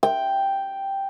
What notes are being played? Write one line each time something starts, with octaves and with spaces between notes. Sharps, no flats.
G5